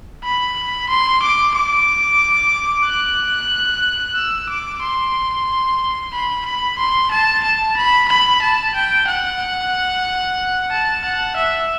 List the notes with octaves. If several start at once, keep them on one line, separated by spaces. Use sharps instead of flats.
B5
C6
D6
D6
F#6
E6
D6
C6
B5
B5
C6
A5
A5
B5
B5
A5
G5
F#5
A5
F#5
E5